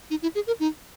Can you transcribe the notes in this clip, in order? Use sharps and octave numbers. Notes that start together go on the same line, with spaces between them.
D#4
E4
G#4
A#4
D#4